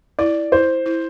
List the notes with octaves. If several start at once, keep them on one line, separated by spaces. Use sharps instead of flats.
E4 D5
E4 C5
E4